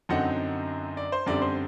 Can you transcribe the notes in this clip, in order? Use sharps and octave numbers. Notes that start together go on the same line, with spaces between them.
F#2 D3 F#3 C4 D#4 F#5
D5
C5
F#2 D3 G3 C4 D5
C5